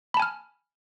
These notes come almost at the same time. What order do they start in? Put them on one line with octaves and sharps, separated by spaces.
B5 A5 G#5 F6